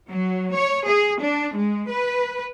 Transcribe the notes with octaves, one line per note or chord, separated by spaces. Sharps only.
F#3
C#5
G#4
D4
G#3
B4